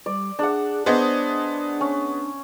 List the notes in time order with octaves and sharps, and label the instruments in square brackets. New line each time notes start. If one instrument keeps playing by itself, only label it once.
[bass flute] G3 [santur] D5
[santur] D4 F#5 [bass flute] G#4
[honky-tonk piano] B3 G#4 D#5 [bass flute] D4 [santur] C5
[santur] C#4